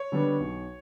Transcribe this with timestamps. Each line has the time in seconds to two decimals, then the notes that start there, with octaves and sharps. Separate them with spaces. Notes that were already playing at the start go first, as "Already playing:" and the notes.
Already playing: C#5
0.12 D3 G3 B3 D4
0.40 B1